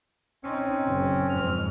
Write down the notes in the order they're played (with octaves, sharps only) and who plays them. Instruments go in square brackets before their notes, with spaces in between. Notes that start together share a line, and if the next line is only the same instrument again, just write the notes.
[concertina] C4 C#4 [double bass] D#4
[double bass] F#1
[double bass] F2 G#2 [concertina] F6